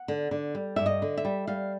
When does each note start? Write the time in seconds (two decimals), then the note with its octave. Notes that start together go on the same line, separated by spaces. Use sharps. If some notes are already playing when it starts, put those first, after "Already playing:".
Already playing: F#5
0.08 D3
0.31 D3
0.55 G3
0.76 G2 E5
0.86 D#5
1.02 D3
1.17 E5
1.25 G3
1.47 G3 F5